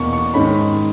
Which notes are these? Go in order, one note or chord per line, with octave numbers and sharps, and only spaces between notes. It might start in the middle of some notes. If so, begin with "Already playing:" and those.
Already playing: E2 B2 A#3 C#6
C#6
G#2 D#3 G#3 C#4 B5